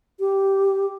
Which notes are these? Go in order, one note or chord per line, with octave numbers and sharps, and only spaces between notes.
G4